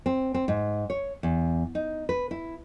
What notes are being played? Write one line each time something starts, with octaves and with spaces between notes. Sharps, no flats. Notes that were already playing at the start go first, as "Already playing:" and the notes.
C4
C4
G#2
C#5
E2
D#4
B4
E4